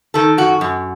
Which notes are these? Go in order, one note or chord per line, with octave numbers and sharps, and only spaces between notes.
D#3 A4
F#2 F#4
F#2